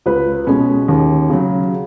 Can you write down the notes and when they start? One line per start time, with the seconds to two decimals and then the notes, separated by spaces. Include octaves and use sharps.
0.06 C#2 B4
0.47 B2 G#3 C#4
0.88 D#2
1.30 C#3 F#3